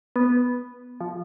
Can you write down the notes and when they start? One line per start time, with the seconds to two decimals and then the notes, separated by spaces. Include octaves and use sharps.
0.16 B3
1.00 F3